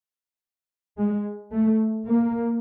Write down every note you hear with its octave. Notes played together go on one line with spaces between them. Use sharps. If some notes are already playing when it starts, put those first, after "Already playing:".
G#3
A3
A#3